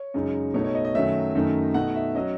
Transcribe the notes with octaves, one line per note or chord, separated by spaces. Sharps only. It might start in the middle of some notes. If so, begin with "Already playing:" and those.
Already playing: C#5
F#2 C#3 G#3 D#4
B2 A3 D#4 C#5
C#5
D#5
D#5
F#2 D#3 F#3 A3 C#4 E5
F#2 D#3 A3 D#4
B2 A3 D#4 F#5
E5
F#3 C#4 D#5